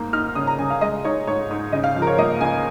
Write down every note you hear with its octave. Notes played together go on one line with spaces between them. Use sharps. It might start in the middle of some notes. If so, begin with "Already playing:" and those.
Already playing: G#2 A#3
D#4 F6
C#3 D#6
A#5
C#3 G#5
F5
G#3 D#5
D#4 C#5
G#2 C#5
G#2
C#3 D#5
F5
F3
A#4
C#5
A#3 D#5
C#2 G#5